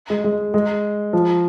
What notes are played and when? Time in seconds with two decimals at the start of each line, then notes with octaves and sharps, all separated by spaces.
0.10 G#3
0.24 G#3
0.54 G#3
1.13 F3